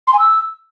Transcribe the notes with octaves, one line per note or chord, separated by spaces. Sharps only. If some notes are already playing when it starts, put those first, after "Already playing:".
C6
G#5
E6